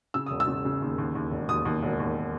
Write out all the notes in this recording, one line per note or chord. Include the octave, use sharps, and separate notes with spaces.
C#3 E6
E1 D#6
E6
C#3
C#3
D#2
D#2
D#2
E1
D#2 D#6
D#2
E1
D#2